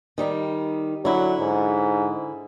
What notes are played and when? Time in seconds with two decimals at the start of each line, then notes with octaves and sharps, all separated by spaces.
0.18 D#3 G3 D#4
1.05 D3 F#3 E4
1.40 G#2